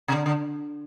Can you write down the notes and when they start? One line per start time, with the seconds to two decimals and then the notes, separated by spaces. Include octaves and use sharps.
0.08 C3
0.12 D3
0.26 D3